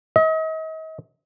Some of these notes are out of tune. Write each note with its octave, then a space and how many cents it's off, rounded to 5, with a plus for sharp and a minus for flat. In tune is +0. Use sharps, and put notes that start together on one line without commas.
D#5 +40